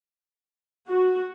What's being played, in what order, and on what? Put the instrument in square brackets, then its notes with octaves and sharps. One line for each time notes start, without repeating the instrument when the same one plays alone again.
[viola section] F#4